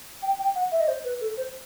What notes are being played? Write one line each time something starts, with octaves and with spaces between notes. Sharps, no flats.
G5
G5
F#5
E5
D#5
C5
B4
A4
C5